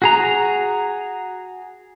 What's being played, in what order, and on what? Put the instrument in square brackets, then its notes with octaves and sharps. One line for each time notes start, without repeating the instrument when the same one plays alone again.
[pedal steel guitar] F#4 G#4 A#5